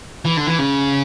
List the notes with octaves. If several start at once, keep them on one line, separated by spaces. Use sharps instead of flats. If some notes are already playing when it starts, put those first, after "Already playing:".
E3
D3
E3
C#3